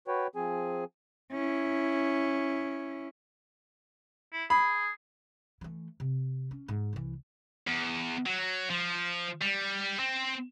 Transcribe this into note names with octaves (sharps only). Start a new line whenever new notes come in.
F#4 B4 C#5 G5
F3 C4 G#4 G#5
C#4 E4
E4
G#4 B5
E3 A3
C3
C#4
G#2
C2 E3
E2
F#3
F3
G3
C4